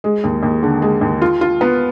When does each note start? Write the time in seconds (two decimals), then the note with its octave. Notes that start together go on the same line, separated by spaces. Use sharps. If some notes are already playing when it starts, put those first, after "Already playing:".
0.04 G#3
0.24 D#2
0.43 D#2
0.63 D3
0.82 G#3
1.01 D#2
1.22 F4
1.41 F4
1.61 B3